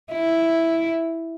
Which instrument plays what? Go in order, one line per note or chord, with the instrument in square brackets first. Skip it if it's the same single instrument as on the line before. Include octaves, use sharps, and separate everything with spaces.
[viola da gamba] E4